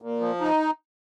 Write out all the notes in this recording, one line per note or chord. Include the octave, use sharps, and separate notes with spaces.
A#2
F3
D#4